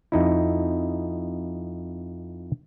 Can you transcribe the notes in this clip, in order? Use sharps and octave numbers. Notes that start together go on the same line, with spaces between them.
F2 D#4 E4